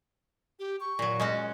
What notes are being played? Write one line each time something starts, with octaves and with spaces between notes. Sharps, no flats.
G4
C#6
A#2 F#3
G#3 C#4 F#4